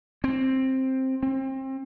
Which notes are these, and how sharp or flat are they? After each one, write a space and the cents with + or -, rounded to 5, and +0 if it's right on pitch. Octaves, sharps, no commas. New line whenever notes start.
C4 +10
C4 +30